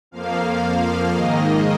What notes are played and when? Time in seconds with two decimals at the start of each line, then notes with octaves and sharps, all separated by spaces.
0.11 F2 F3 A#3 F5
1.11 G#2 D#3 A#3 D#5